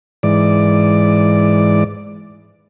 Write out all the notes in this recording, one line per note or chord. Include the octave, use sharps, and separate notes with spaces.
G#2 E3 D5